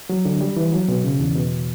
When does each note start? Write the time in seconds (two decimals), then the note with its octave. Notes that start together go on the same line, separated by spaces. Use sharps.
0.10 F#3
0.25 D3
0.41 G3
0.57 E3
0.73 F#3
0.88 B2
1.04 C#3
1.20 E2
1.36 B2